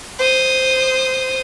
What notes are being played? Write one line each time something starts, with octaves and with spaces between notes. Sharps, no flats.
C5 D#6